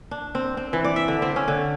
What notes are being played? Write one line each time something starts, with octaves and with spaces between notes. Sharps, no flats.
D4
C4
C4
E3
D5
E5
D3
C4
C#4
D3